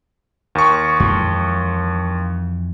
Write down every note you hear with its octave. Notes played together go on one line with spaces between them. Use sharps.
D#2 C#6
F2 E3 G#3